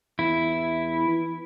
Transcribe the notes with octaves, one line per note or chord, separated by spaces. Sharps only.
E2 E4
E3